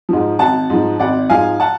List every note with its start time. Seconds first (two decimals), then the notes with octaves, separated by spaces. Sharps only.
0.09 G#2 F3
0.39 G#1 F#5 A5
0.70 G#2 F3
0.99 G#1 D5 F#5
1.29 G#2 F3 F5 G#5
1.60 F#5 A5